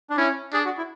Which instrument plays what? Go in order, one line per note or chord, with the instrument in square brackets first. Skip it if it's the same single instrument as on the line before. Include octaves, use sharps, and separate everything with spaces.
[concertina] D4
[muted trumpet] C#4 [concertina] E4
[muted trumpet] D4 [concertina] G#4
[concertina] F#4
E4